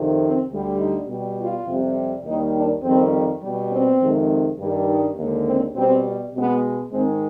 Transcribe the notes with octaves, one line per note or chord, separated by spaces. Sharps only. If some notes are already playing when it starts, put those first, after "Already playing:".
Already playing: F2 C3 D#3
C4
D2 D3 G3
D#4
B2 G3
F4
F2 C3 G3
D#2 D#3 G3 D#4
D4
F2 D#3 G3 C4
B2 G3
C4
F2 C3 D#3 G#3
G2 D#3 G3
D#4
D#2 D3 G#3
C4
B2 G3 C4
B2 G#3 B3
G#2 D#3 G#3 C4